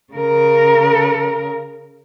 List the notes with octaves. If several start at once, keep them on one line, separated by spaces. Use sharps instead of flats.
C#3 A#4